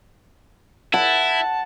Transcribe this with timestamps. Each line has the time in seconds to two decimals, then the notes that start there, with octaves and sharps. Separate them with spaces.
0.94 E4 F#5 A5